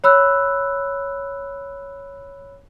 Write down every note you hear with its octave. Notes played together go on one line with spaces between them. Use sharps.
C#5 B5 E6 F#6